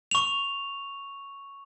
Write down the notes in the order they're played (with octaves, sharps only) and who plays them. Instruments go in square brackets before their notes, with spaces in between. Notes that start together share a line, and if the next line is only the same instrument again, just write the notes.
[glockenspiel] C#6 F7